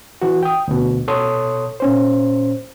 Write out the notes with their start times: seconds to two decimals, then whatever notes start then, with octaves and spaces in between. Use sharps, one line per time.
0.22 E3 F#4
0.43 G5 D#6
0.68 D2 B2
1.08 B2 A4 C#5 C6 D#6
1.80 A#2 C#4 C5